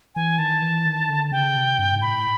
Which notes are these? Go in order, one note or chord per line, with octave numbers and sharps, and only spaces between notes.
E3 G#5
D#3 A5
E3
D#3
D3
C#3 G5
C3
G2
G#2
A2 B5